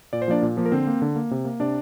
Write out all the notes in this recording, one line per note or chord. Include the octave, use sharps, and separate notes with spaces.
A#2 D5
C5
F3 A#3 D4 D5
A#2
F3 A#3
A#4
D3 C4 C5
A#3
D3
A#3
C3
A#3
C3 D4 D5